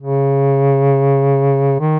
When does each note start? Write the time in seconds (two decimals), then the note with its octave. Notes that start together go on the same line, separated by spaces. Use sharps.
0.01 C#3
1.80 D#3